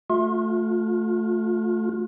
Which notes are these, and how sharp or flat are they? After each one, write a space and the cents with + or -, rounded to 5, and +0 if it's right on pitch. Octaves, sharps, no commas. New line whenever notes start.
A3 +0 F4 +40